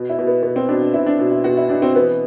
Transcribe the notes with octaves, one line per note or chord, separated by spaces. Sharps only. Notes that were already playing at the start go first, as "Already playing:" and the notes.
Already playing: B2
E4
B2
B3
B2 B3
C4
B2 D4
D4
B2 E4
D4
B2 D4
E4
B2 F#4
E4
B2 D4
C4
E3 B3